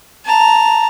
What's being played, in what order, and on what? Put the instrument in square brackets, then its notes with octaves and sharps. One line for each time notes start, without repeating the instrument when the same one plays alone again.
[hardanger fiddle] A5 A#5